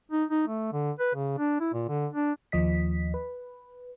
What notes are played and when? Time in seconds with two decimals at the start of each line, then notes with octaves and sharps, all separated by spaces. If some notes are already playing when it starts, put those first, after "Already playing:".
0.11 D#4
0.30 D#4
0.48 A3
0.73 D3
0.99 B4
1.15 C#3
1.38 D4
1.60 E4
1.73 A#2
1.88 D3
2.13 D4
2.52 D#2 F3 D#5 B6
3.14 B4